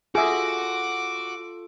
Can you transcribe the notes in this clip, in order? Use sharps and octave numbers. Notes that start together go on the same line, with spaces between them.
F4 F#4 G#4 A4 E5 D6